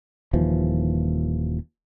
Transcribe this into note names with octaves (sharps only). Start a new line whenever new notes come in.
D#1 D#2 E3 F3